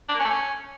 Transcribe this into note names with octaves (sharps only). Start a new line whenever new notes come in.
D4
A#3
C#4
A3
C#4